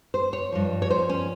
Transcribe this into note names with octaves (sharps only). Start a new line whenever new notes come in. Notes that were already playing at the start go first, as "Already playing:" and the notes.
C5
C#5
G2 F3
C#5
C5
C#4